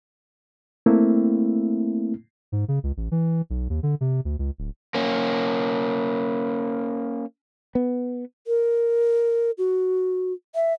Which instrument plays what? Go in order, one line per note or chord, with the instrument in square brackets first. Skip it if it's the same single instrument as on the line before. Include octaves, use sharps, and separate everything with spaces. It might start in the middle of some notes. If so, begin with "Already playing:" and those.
[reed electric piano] A3 A#3 C4 E4
[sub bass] G#2
C#3
C#2
A1
E3
B1
D#2
D3
C3
D2
C#2
D1
[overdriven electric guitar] A#3 C#4
[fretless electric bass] B3
[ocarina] A#4
F#4
E5